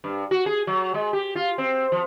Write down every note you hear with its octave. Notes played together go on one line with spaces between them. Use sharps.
G2
F#4
G#4
F#3
G#3
G4
F4
C4
F3